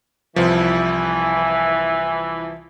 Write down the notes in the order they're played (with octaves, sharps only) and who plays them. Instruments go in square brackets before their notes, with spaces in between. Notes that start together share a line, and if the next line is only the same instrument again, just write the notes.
[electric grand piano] C2 F3 [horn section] E3